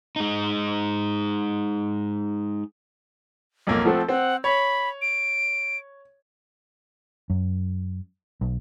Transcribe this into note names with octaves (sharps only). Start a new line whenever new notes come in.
G#3 D#4
B1 F2 A#3
F3 A3 C4 F#5
C4 F#5
C#5 B5
D7
F#2
B1